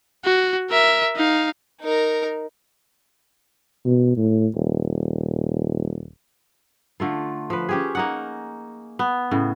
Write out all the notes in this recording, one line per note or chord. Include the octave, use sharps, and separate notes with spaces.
F#4
A#4 E5
D#4 F5
D#4 A#4
B2
A2
D#1
D3 A3 F4
F3 B4
C#4 G4 G#4
A#3 D#4 F#5
B3
A2 C#3